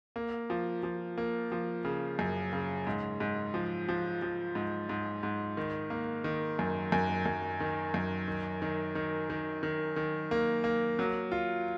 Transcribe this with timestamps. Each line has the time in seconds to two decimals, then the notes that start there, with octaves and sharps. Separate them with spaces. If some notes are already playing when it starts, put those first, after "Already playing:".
0.16 A#3
0.50 F3
0.83 F3
1.18 A#3
1.52 F3
1.85 C#3
2.19 F#2
2.53 C#3
2.87 G#2
3.20 G#2
3.54 F3
3.88 F3
4.22 F3
4.55 G#2
4.89 G#2
5.23 G#2
5.57 D#3
5.90 A#3
6.24 D#3
6.59 F#2
6.92 F#2
7.26 F#2
7.60 D#3
7.94 F#2
8.28 D#3
8.62 D#3
8.95 D#3
9.30 D#3
9.63 D#3
9.96 D#3
10.31 A#3
10.64 A#3
10.99 F#3
11.32 F4